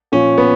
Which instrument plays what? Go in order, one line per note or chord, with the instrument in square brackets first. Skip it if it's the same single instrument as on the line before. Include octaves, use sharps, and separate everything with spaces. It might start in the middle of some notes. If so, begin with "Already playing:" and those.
[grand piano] A#2 F3 C#4
B3